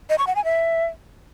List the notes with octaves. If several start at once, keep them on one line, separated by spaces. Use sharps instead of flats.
D#5
C#6
F#5
G#5
E5